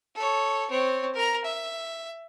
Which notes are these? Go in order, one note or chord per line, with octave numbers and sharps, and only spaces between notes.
A4 C#5
C4 C#5
A#4 A#5
E5